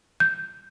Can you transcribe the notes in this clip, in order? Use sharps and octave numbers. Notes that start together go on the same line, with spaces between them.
G6